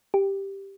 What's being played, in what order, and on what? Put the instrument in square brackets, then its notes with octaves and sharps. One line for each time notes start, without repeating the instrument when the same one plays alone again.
[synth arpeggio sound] G4